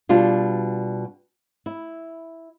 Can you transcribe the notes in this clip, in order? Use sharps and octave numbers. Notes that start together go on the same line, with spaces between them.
B2 G3 D4 F4
E4